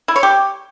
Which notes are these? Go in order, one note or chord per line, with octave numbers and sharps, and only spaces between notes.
E4
C#5
G4